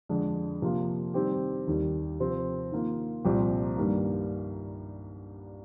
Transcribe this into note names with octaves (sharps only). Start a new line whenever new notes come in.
F2 D3 G#3 D4
C3 F3 A#3 F4
D#3 G3 C4 G4
D#2 D#3 G3
C3 F3 C4 G4
D#3 A#3 F4
C2 A#2 F3 C4 G4
G2 D#3 G3 A#3